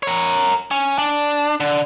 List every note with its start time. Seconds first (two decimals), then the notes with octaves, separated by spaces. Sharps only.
0.03 A#4 C#5
0.71 C#4
0.98 D4
1.60 D3